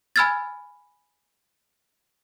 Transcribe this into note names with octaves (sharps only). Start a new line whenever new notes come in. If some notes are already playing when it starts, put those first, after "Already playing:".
G#5 B5 E6 F6 G#6 A6